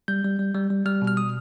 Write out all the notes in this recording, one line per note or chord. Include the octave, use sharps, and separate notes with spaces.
G3 G6
G3
G3
G3
G3
G3 F6
B2
F6
D#6